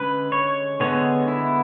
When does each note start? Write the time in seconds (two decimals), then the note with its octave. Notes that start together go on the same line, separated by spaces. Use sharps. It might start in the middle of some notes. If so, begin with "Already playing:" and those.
Already playing: D3 G#3 C#4 B4
0.32 C#5
0.80 D3 G#3 B3 C#5
1.28 E4